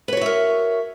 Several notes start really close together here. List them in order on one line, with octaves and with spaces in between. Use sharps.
B4 C#5 F#4 E5 A#4